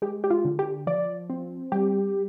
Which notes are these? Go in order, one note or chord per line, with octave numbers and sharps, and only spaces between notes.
G#3 G4
G4
F4
D3
G4
F3 D5
C4
G3 G4